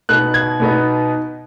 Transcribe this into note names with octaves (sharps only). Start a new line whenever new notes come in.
B2 B3 D#4 F#6
G#6
B2 B3 D#4